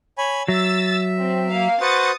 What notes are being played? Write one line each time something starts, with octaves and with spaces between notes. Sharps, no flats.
C#5 G#5 B5
F#3 E5 E6 A6
C4
A#3 F5
F#4 B4 C5 D#6 A6 C#7